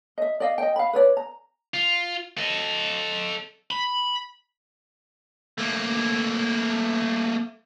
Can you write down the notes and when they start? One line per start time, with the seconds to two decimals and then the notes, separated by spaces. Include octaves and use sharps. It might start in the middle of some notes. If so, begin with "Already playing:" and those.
0.18 D#5 E5
0.40 D5 D#5 F5
0.58 D#5 G5
0.76 F5 B5
0.93 B4 C#5 D5
1.17 A#5
1.74 F4
2.38 A4 D#5
3.71 B5
5.58 A3 A#3